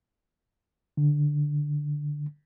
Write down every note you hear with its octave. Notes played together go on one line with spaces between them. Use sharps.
D3